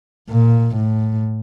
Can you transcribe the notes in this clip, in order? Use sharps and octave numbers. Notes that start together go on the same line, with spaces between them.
A#2
A2